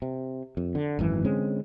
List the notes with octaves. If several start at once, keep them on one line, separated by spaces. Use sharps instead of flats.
C3
F2
D3
G#1 F#2 E3
D3 G#3 C4 C#4